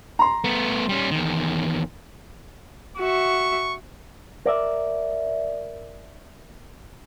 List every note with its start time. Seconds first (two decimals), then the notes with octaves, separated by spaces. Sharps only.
0.19 A#5 C6
0.44 A3 B3
0.89 G3 C#4
1.11 E2 D#3
2.97 F#4 E5 C#6
4.46 A#4 D5 E5